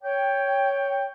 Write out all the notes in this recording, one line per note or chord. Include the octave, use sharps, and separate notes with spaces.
C#5 G5